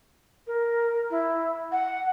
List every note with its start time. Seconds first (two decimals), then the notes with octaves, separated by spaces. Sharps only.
0.47 A#4
1.10 E4
1.71 F#5